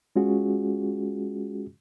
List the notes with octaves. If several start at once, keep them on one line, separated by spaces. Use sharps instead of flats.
G#3 C#4 F4 F#4 G#4